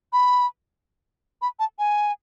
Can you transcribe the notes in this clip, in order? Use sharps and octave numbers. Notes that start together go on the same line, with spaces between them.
B5
B5
A5
G#5